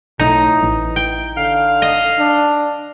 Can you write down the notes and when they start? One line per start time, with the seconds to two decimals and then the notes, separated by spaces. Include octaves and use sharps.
0.20 B1 A2 D#4
0.63 A1 E3
0.96 G5
1.37 D3 F5
1.82 D#5
2.19 D4